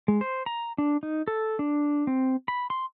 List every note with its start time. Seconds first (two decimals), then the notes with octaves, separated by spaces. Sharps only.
0.08 G#3
0.21 C5
0.46 A#5
0.78 D4
1.03 D#4
1.28 A4
1.59 D4
2.07 C4
2.48 B5
2.70 C6